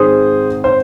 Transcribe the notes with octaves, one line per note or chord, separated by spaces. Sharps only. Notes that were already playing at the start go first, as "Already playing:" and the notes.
Already playing: G#2 D#3 C4 G#4 C5
C5